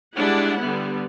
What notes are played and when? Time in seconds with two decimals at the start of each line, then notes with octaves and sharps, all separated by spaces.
0.16 G3 G#3 D4 E4 F#5
0.61 D3 G3 B3